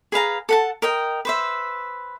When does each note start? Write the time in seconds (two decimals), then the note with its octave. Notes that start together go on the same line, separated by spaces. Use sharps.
0.12 G#4 B4 F5 A#5
0.49 A4 F#5 A5
0.82 A#4 D#5 G5
1.25 B4 C5 E5